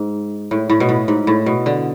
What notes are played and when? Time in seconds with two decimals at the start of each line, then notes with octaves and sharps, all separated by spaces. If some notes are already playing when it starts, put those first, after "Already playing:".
Already playing: G#2
0.51 A2
0.70 A2
0.80 B2
0.89 A2
1.08 G#2
1.27 A2
1.46 B2
1.66 D3